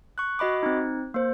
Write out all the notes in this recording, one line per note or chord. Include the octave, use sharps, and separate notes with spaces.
C#6 F#6
F#4 D#5 B5 D6
C4 D#4
A#3 C5